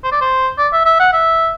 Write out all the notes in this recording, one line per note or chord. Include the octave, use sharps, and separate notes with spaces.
C5
D5
C5
D5
E5
E5
F#5
E5